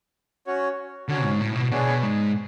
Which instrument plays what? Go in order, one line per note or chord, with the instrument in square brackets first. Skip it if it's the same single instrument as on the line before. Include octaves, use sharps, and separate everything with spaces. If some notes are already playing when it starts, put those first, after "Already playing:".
[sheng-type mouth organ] C#4 F#4 C#5
[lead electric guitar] D3 [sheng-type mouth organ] C#4 F#4 C#5
[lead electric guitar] G#2
A2
B2
[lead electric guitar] B2 [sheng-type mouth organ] B3 D4 G#4 C#5
[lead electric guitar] G#2